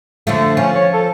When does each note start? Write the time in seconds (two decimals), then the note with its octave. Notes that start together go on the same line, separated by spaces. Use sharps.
0.27 D3 F3 A3
0.57 F3 C#4
0.75 C#5
0.93 A4